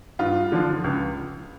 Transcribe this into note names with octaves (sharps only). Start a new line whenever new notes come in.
G2 F4
D3 F3
C#2